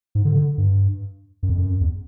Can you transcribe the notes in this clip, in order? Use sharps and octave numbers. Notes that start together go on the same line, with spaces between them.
G#2
D3
D3
G2
F#2
F2
F#2
E2